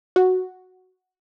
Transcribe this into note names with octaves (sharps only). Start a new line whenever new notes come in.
F#4